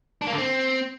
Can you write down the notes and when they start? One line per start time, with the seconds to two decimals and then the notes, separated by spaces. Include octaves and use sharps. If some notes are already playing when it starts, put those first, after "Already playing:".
0.22 D4
0.27 A#3
0.33 D3
0.38 C4